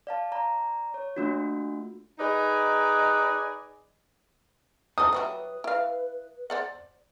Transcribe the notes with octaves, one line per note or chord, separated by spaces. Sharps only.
D5 F5 A5
D5 A#5
C#5
A3 A#3 D4 F4 F#4
D#4 G#4 B4 D5 D#5
D#4 A4 D#6
F#3 G3 E4 B4
E4 F5
C5 D5 F#5